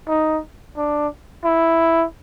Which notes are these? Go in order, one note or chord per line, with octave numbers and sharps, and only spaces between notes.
D#4
D4
E4